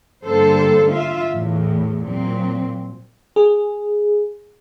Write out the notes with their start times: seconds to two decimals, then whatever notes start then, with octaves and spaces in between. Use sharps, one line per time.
0.24 G2 D3 G3 A#3 A4 C5
0.91 F4 E5
1.32 E2 A2
2.04 A#2 F#3 C4
3.36 G#4